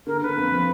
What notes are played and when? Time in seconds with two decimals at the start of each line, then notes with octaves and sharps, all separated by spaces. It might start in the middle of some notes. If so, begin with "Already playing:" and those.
0.07 D3 A#4
0.22 D3 B4
0.36 F2
0.52 F3